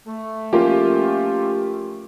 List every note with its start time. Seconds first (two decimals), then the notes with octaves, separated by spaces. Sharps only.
0.07 A3
0.53 F3 A#3 C#4 F4 G4